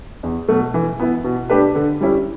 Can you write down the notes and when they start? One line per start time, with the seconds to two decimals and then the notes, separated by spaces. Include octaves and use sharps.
0.23 E2
0.48 B2 F#3 A3
0.74 E3
1.00 B3 E4
1.24 B2
1.50 A3 D4 G4 B4
1.75 D3
2.01 G3 C#4 E4